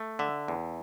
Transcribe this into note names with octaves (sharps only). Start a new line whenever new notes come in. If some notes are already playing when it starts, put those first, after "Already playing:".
Already playing: A3
D3 E5
E2